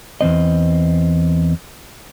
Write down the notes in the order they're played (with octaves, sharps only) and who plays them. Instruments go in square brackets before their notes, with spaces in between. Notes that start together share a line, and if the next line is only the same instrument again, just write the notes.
[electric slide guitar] E2 C#3 C4 D#5